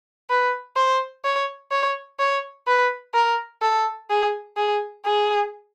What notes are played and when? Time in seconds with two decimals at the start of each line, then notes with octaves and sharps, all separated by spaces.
0.30 B4
0.76 C5
1.25 C#5
1.72 C#5
2.19 C#5
2.67 B4
3.14 A#4
3.62 A4
4.10 G#4
4.57 G#4
5.06 G#4